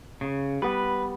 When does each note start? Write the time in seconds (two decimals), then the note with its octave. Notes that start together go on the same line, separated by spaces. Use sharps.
0.21 C#3
0.62 G3 B3 B4